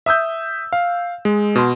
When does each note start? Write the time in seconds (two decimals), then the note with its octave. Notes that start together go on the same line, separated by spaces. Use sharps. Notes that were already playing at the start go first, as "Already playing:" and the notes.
0.06 E5 D#6 E6 G6
0.73 F5
1.25 G#3
1.56 B2 C6